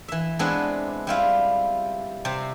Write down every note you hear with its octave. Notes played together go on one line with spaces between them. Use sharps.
E3 E5
G#3 B3 C4 D4 E4 F#5
G3 E4 F4
C3 C4 C5